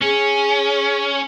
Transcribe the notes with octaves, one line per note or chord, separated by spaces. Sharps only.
C#4 G#4